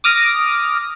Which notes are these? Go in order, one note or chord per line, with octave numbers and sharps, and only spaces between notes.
D6 D#6 F6 A#6 D7